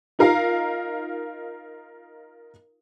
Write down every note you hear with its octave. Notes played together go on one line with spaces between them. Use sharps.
D#4 F4 A#4 F5 A#5